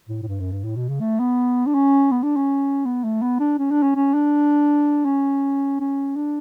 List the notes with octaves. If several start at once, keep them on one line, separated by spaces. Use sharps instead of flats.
A2
A2
G2
F#2
G2
A2
B2
C#3
A3
B3
D4
C#4
B3
D4
C#4
B3
A3
B3
D4
C#4
D4
C#4
C#4
D4
C#4
C#4
D4